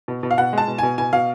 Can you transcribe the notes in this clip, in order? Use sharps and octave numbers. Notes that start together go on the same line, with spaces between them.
B2
B2
F5
B2 F#5
G#3 A5
B2
B2 G#5
B2 G#5
B2 F5